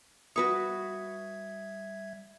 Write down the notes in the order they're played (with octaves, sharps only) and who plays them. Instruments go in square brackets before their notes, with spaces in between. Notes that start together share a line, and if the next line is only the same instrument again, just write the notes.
[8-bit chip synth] G3 E5 G#6 [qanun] F#4 B4 C#6 [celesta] D#6